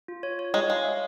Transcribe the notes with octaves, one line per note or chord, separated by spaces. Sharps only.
F4
C#5
C#5
G#3 C#5
G#3 F5
E5